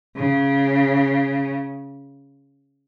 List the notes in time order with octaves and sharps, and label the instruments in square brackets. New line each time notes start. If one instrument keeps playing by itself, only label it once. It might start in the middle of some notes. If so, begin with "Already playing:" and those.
[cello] C#3